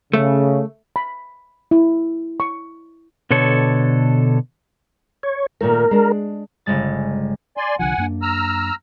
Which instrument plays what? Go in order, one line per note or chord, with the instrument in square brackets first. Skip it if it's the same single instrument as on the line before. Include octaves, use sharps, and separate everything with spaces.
[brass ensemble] C#3 [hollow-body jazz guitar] A3
[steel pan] B5
E4
C#6
[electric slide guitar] B2 D3 A4 C#5
[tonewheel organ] C#5
[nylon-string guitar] A#2 D#3 A3 [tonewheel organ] A#4
[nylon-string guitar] G#3 D4
[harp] G1 C#3 G#3 A6
[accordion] D5 G#5 C6
[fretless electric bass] C2 D3 F3 [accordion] F#5 G#5
[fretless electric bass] F#2 A#3 D4
[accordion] A#5 E6 F6